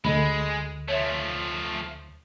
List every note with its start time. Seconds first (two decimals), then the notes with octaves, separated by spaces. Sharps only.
0.05 D2 G#3 A4 D#5 B5
0.88 F3 A3 C#5 E5